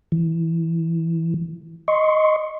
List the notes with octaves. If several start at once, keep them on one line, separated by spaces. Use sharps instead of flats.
E3
D#5 C6 C#6